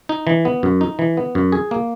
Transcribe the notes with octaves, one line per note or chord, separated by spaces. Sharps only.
D#4
E3
B3
F#2
D#4
E3
B3
F#2
G#4
A#3